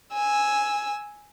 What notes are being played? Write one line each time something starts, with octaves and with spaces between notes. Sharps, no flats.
G#5 E6